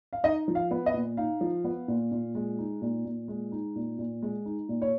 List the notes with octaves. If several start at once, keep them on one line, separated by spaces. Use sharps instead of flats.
F5
D#4 D#5
F3
F5
B3
D#5
A#2
D#4 F5
F3
B3
A#2
A#2
G#3
D#4
A#2
A#2
G#3
D#4
A#2
A#2
G#3
D#4
A#2
C#5